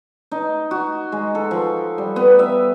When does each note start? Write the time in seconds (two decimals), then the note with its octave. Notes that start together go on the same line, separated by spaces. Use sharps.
0.32 D#4
0.71 F#4
1.12 G#3
1.35 A4
1.51 F3
1.98 G3
2.16 B3
2.39 E5